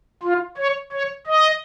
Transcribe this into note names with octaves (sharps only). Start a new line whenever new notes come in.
F4
C#5
C#5
D#5